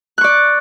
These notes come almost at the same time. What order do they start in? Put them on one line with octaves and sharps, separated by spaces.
F#6 C#6 D5